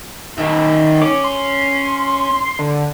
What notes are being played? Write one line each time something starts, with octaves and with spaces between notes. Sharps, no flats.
D#3 E5
C#4 C#5 D6
C6
D3